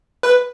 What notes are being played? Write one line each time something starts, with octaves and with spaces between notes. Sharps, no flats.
B4